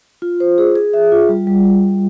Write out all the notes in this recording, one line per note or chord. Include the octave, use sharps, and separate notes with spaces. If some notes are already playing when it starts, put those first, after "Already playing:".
F4
C5
G#4
G#4
E5
F4
G3
G3